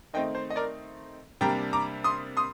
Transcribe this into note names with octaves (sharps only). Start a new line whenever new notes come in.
D#3 A3 C4 D#4 D#5 G5
C5
D#5
A#4 D5
C3 G3 A#3 D4 G5 A#5
A#5 D6
C6 D#6
C6 D#6